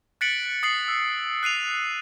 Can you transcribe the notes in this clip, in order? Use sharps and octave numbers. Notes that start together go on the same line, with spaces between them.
F#6 A6 B6 C#7 D7 F#7
D#6 A6 C7 F#7
E6
F#6 C7 D#7 F7